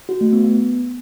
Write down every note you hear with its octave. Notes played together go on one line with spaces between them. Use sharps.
F#4
A3
B3
B3